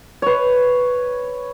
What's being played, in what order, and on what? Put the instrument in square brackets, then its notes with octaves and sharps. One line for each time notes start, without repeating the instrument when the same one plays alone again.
[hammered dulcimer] B4 C#5